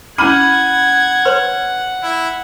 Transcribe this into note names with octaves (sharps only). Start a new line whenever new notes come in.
C#4 E4 F#5 B5 D6 F6 G#6 D#7
B4 C#5 C6
E4